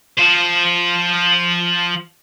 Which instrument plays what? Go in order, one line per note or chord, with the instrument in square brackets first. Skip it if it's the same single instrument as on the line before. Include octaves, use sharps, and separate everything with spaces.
[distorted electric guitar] F3 C5